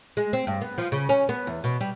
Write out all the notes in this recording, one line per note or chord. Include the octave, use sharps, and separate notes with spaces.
G#3
C4
G2
B3
F3
C#3
C#4
B3
E2
B2
G3